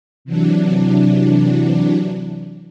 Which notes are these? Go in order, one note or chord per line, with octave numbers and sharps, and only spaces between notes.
C3 E3 F#3 D4